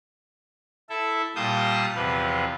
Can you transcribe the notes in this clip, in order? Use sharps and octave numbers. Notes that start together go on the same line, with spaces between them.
E4 A4 E5
A#2 G3 F5 A5 D#6 G6
E2 C3 F3 B4